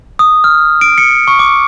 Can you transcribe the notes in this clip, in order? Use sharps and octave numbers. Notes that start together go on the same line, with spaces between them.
D#6
F6
D7
C#7
C#6
D6